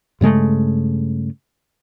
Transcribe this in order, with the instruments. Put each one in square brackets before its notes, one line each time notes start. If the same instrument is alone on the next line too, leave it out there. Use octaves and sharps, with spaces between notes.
[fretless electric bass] G2 C#3 G#3 A3